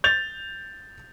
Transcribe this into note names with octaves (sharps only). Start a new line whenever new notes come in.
G6 A6 F7